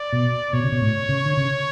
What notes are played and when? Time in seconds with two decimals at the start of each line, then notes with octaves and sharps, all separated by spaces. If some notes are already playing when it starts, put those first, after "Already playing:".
Already playing: D5
0.13 B2
0.53 B2 C#5
0.63 C#3
0.73 B2
0.82 A2
1.09 C#3
1.26 D3
1.37 C#3